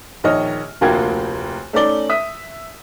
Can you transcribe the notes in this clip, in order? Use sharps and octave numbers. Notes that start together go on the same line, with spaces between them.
A#1 D#3 C#5 D#5 F6
F1 D2 A#3 F4 G5 G#6
A3 C#4 D#4 D5 G7
E5 D#6 B6